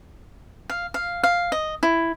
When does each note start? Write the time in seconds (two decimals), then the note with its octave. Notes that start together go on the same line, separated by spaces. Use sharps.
0.70 F5
0.94 F5
1.23 F5
1.52 D#5
1.83 E4